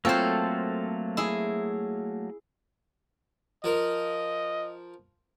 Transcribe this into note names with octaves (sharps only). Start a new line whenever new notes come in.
F#3 A3 A#3 C4 F4 A4 C5 C#5
E4 G#4
F3 A#4 D#5